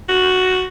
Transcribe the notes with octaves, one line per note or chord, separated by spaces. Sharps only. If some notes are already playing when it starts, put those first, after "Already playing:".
F#4